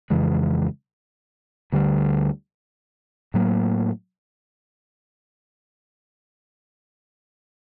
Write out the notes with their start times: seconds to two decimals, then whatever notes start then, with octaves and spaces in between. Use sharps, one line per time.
0.10 F2 C#3 E3 G#3
1.72 D2 D3 G3
3.34 A2 F#3 A#3